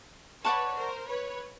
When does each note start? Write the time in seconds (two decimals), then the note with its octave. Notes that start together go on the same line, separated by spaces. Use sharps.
0.44 B4 C#5 D5 F#5 A5 C#6
0.76 A#4 C5
1.07 B4 C#5